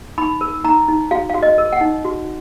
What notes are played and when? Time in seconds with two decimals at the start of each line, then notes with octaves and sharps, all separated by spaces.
0.18 D#4 B5
0.41 A#4
0.65 D#4 A#5
0.88 D#4
1.11 F#4 F5
1.29 F#4 F5
1.43 D#5
1.58 A#4
1.73 F#5
1.81 D#4
2.04 F#4